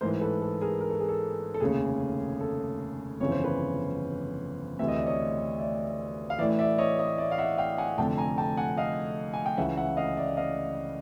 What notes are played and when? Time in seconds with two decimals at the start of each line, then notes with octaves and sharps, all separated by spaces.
0.01 A1 G#2 E3 A#4 C5
0.21 A4 B4
0.41 A4
0.61 G#4 A#4
0.81 A#4
0.90 A4
1.00 G#4
1.09 A4
1.54 A4
1.60 F1 D#2 C#3 G#4
2.40 A4
3.20 G1 F2 C#3 E3 C#5
3.32 C5
3.44 B4 C#5
4.79 D2 C3 E3 E5
4.88 D#5
4.97 D5
5.06 C#5 D#5
5.58 D5 E5
6.30 F5
6.39 A1 A2 E3 D5 E5
6.59 D5 E5
6.78 C#5 D#5
6.99 C#5 D#5
7.18 D5 E5
7.31 F5
7.38 E5 F#5
7.58 F5 G5
7.78 F#5 G#5
7.98 F1 F2 D3 G5 A5
8.17 G#5 A#5
8.38 G5 A5
8.57 F#5 G#5
8.77 D#5 F5
9.34 G#5
9.46 G5
9.57 C#2 C#3 E3 E5 F#5
9.77 E5 F#5
9.97 D#5 F5
10.17 D5 E5
10.37 D#5 F5